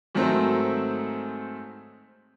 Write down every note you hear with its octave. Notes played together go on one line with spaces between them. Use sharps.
G#2 D#3 F#3 A3 C4